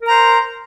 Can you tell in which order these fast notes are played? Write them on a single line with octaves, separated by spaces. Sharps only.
A#4 A#5 C5